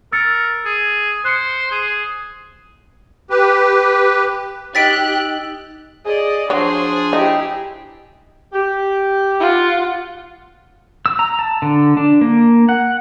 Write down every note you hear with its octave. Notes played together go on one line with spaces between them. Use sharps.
A#4 E6 A6 C#7
G#4
C5 F#6 C#7
G#4
G4 B4
D#4 G4 D#5 E6 F#6 A6 B6 D7
G#4 D5 D#5
F3 F#3 D4 G#4 C5 C6
D#4 E4 G4
G4
F4 F#5
E6
A#5
A5
D3
D4
A#3
F#5